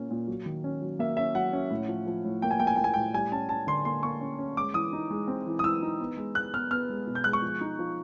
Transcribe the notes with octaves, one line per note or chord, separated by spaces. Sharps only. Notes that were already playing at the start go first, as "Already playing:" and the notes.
Already playing: A#2 A#3 C#4
A#2
F#3
D#3
C#4
F#3
A#3 E5
C#4 E5
F#3 F#5
C#4
A2
F3
F3
A2
A#3 G5
G#5
A#3 G5
G#5
A#3 G5
G#5
A2 G5
G3 G#5
C#4 A5
C#4 A5
D3 C6
A#3 C6
A#3 C#6
C#4
C#4
G#3 D6
E3 D#6
D#4
G#3
C4
E3
D#6
E3 E6
D#4
B3
G#3
G#3 F#6
B3 F6
B3 F6
G#3
B2
G6
G#3 F#6
C#6
F3
D#4
F3